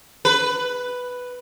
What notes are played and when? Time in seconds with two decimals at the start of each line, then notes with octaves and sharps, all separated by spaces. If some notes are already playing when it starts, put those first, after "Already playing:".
0.25 B4